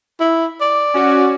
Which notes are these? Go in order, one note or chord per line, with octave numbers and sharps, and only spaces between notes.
E4
D5
C#4 F#4